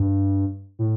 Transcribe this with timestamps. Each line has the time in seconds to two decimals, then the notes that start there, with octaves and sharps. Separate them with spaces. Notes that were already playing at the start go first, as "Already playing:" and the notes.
Already playing: G2
0.79 A2